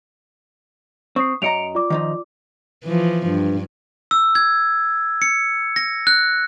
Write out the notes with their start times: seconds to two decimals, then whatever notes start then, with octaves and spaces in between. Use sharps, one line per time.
1.16 C4 C#6 D#6 C7
1.42 F#2 D#5 A#5 C#7 D7 F7
1.75 F4 D5 D6
1.90 D#3 F3 D#4
2.84 E3 F3
3.27 G2
4.11 E6
4.35 G#6
5.22 C#7
5.76 A#6
6.07 F#6